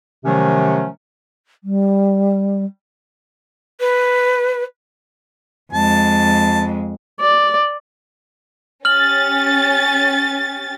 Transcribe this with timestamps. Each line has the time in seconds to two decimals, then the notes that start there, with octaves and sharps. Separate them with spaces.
0.25 C3 D#3 F3 F#3 A3 C#4
1.64 G3
3.80 B4
5.73 F2 G#3 A5
7.21 D5
8.85 C#4 G4 F6 A6 F#7